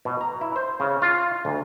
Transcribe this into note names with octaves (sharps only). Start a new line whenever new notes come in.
B2
A#5
E4
C5
C#3
F4
D2